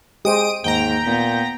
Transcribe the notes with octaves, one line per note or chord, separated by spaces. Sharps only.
G#3 G4 C5 D#5 D#6 D7 D#7
D#2 G#2 G5 A#5
A#2 B3